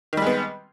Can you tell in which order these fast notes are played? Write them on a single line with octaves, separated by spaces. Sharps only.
D#3 G3 G#3 B3